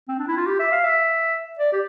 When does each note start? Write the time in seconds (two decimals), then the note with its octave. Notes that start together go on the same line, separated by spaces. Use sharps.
0.08 C4
0.19 D4
0.28 E4
0.37 F4
0.46 G4
0.59 E5
0.72 F5
0.84 E5
1.59 D5
1.72 G4